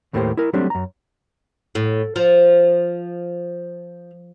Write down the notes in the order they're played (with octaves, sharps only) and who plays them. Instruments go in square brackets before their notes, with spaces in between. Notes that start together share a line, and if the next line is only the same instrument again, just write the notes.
[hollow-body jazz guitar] D#2 A2 A3 A#3 G4 C5
E4 A#4
F#3 G3 A3 C4 D4
F#2 A#5
[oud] A2
F3